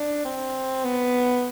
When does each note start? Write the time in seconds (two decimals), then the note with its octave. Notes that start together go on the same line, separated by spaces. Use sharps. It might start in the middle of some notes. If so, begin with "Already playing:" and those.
Already playing: D4
0.25 C4
0.85 B3